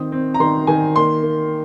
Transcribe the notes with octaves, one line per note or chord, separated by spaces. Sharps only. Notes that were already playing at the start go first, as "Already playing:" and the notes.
Already playing: D#3 C4 D#6
C4
A#5
D#3 C6
D#3 G#5
A#3 C6
A#3